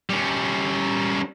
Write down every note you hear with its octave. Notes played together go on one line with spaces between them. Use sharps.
G3 C#4